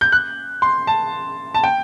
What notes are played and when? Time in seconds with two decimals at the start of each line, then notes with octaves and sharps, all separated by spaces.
0.01 G6
0.12 F#6
0.62 C6
0.87 A5
1.54 A5
1.64 G5